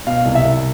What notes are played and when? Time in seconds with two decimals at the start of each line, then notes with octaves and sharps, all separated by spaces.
0.06 B2 F5
0.25 C2
0.35 E5
0.44 C2